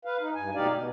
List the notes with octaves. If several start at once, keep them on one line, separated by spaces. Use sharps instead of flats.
B4 F5
D#4
G2 G#5
D2 B2 D#4 G4 D5 F5
B2